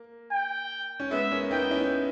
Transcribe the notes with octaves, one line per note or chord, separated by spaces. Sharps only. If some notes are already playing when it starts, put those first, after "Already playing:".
Already playing: A#3
G5
C#4
G#3 B3 E5
A#3 C#4
B3 D#4 G5
C#4 E4